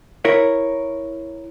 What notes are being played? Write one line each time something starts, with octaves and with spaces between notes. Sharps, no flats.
E4 A#4 C#5